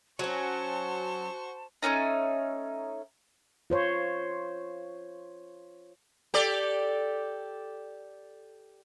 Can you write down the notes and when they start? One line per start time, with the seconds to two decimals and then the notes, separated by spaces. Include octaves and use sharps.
0.19 F#3 C#4 F#4 C5 A5 C#6
1.83 A3 B3 C#4 D#4
3.70 F4 C5 C#5
6.34 G4 A4 D5